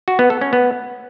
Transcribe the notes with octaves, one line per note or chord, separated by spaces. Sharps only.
F#4
B3
A4
C#4
B3